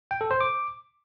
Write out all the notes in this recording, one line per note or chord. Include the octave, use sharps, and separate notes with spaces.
G5
A4
C5
D6